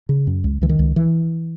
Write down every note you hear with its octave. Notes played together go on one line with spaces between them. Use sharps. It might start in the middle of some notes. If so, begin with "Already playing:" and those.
C#3
F#2
C#2
C#2 E3
D#3
C#2
E3